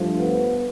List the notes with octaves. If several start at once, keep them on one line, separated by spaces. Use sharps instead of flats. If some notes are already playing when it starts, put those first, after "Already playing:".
Already playing: G2 F3 A3
B3